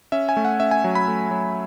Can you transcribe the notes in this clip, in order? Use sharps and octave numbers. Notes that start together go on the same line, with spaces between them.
C#4 E5
G#5
A3
F#5
C#4 E5
G#5
F#3
B5
A3
F#3